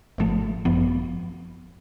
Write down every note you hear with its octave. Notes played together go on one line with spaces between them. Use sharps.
G#1 G#2 F3 A3
G#1 F#2 F3 B3